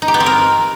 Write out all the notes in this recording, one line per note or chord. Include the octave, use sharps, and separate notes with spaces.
D#4
G4
B3
C4
A#4